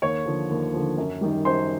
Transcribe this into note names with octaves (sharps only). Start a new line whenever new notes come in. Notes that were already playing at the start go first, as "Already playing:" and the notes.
D#2 C#5 C#6
D3 F3
D#2
D3 F3
F#2
D#3 G3
F#2 C5 C6